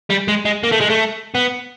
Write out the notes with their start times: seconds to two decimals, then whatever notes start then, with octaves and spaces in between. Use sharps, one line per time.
0.10 G3
0.28 G#3
0.45 G#3
0.63 A#3
0.72 A3
0.80 G#3
0.90 A3
1.35 B3